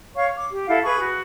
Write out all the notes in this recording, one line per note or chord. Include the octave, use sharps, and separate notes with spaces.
C#5 F5 C#6
D6
G4
E4 A4 F5 F#5
G#4 B4 B5 C#6
F#4